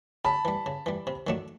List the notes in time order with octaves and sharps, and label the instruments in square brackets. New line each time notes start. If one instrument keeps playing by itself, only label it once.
[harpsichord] C#3 [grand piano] A5 B5
[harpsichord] E3 G3
C#3
E3 G3
C3
D#3 F#3 A3 D4